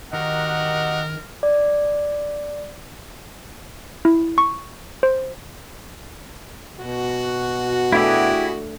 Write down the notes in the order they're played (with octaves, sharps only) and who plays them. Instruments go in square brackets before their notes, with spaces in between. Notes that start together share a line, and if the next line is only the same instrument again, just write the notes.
[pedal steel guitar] D#3 [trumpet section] F#4 G4 F#5 [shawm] A#4 [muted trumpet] D#5
[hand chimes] D5
[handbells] E4
C#6
C5
[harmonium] B2 [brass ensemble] F#4
[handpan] A3 D4 E5 [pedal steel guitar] E4 G4 G#4